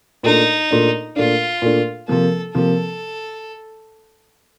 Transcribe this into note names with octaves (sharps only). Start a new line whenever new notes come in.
A#2 A3 D4 D#4
A#2 A3 D4
A#2 A3 D4 F4
A#2 A3 D4
C3 F3 A#3 A4
C3 F3 A#3 A4